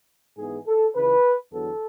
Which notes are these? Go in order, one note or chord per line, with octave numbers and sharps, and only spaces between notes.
G#2 E3 G#3 B3 G#4
A4
C#2 C#3 E3 B4
E2 D3 F#3 B3 A4